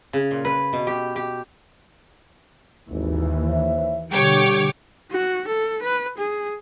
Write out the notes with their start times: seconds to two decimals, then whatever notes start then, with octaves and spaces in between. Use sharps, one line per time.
0.13 C#3
0.31 A#2
0.45 B4
0.73 B2
0.87 G4
1.16 G4
2.90 G#1 D#2 E3
3.48 C5 C#5 E5
4.11 B2 D3 G3 G4 C#5 G5 D6
5.11 F#4
5.48 A4
5.83 B4
6.18 G#4